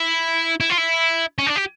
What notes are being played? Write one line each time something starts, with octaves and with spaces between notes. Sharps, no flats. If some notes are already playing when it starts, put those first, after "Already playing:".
Already playing: E4
E4
F4
E4
C#4
D4
G4